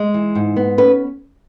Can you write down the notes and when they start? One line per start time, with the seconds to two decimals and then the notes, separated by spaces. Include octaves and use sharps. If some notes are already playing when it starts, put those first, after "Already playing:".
Already playing: G#3
0.14 E3
0.35 G#2
0.56 B3
0.78 C#4 B4